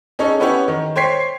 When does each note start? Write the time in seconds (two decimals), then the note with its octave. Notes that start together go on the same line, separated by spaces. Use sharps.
0.19 C#4 D#4 G#4 A4 C#5
0.40 B3 C#4 E4 G4 C#5
0.68 D#3
0.96 C5 C#5 G5 G#6 B6 C7